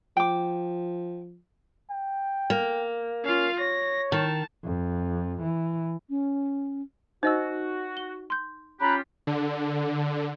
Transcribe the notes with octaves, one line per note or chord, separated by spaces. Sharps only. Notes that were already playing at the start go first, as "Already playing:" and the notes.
F3 G5 D6
G5
A#3
C#4 F4 F5
C#5 A#6
D#3 A5
F2
E3
C#4
D#4 F#4 C5 D#5 E6
G7
C6 G6
C#4 F4 G4 A#5 B5 F#6
D3